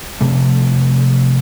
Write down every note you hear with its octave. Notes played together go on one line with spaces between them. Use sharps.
C3 F3 A3 C4